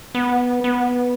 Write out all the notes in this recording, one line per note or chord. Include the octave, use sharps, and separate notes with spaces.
B3
B3